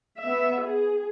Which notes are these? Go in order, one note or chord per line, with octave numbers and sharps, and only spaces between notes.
B3 E5
G#4